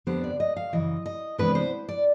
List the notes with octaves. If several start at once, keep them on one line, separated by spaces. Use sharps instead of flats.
F2 D3 G3 B3 D4 C5
D5
D#5
F5
F#2 C#3 E3 D#5
D#5
C3 E3 G#3 B3 D4 B4
C5
D5